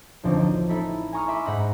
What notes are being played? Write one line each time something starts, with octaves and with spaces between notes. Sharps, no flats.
A1 D2 F3 C4 D#4 D5
D#5
D#4 E4 A4 B5
G#5 A#5 C#6 D#6 F6
E5 B5 C6 D6
G#2 D#4 F#5 B5 A#6